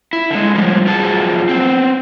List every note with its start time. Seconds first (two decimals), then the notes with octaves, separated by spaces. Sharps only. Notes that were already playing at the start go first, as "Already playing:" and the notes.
0.13 E4
0.31 D3 G#3
0.55 A2 F3 G3
0.86 F#2 F3 F4 G#4 A5
1.49 B3 C4